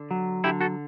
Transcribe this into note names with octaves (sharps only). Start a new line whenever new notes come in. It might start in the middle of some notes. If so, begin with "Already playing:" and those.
Already playing: D3
F#3
D3 E4 G4
F#4 A4